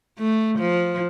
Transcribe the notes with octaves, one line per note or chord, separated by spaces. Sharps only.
A3
F3